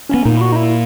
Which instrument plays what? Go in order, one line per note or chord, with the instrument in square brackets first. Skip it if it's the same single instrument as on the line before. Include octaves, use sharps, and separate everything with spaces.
[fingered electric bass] B3 [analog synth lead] C#4
[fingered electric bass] A#2 A#3 [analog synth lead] D#4
[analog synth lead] E4
F#4
D#4
E4